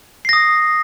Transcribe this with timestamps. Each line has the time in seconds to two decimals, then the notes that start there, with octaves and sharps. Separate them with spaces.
0.25 C7
0.29 A#6
0.33 D#6